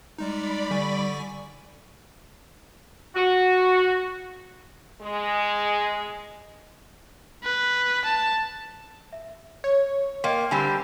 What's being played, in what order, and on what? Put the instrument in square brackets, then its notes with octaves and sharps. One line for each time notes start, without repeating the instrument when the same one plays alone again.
[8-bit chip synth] G3 G#3 D#4 [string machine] D5 B5
[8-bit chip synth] D3 G#5 C#6 [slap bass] G3
[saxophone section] F#4
[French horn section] G#3
[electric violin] B4
A5
[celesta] E5
[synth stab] C#5
[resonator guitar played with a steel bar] A#3 [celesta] D#5 G5 C6
[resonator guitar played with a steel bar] D3 G3 C4 [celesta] G#5 B5